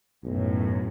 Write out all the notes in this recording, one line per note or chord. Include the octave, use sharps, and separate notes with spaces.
B1 F#2 A2